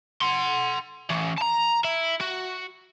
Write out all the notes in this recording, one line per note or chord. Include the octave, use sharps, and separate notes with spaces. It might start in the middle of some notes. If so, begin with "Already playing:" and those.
F#5 C6
E3 C#4
A5 A#5
E4
F#4